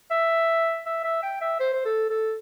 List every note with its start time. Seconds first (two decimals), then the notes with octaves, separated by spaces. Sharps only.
0.11 E5
0.86 E5
1.04 E5
1.23 G5
1.41 E5
1.60 C5
1.73 C5
1.86 A4
2.10 A4